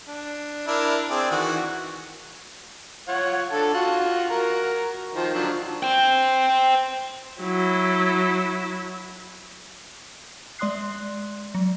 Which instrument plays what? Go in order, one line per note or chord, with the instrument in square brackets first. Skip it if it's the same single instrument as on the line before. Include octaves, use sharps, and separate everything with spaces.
[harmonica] D4
D4 E4 A#4
C4 G#4 D5
D#3 E3 F#4
F4 C#5 F#5
D3 A4
F4 F#4
F#4 A#4
D#3 F3 C5
D3 F3 F#3
[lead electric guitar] C5 G5
[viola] F#3 E4
[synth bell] G#3 D5 C6 D#6 F#6 C7
F#3